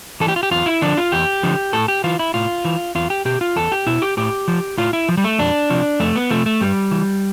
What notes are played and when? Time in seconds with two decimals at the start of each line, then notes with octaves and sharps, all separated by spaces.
0.20 E3 A4
0.28 G4
0.36 F4
0.43 G4
0.51 E2 F4
0.66 E4
0.82 D3 F3 D4
0.97 F4
1.12 E2 G4
1.43 D3 F3
1.73 A2 A4
1.88 G4
2.04 E3 F4
2.19 E4
2.34 A2 F4
2.65 E3
2.95 E2 F4
3.10 G4
3.25 B2 G4
3.41 F4
3.56 E2 A4
3.72 G4
3.87 B2 E4
4.02 G4
4.17 A2 G4
4.48 F3
4.78 A2 F4
4.93 E4
5.09 F3
5.17 G3
5.24 A3
5.39 F2 D4
5.70 C3 F3
6.00 F2 A3
6.16 B3
6.31 C3 F3 A3
6.46 A3
6.60 G2 G3
6.91 E3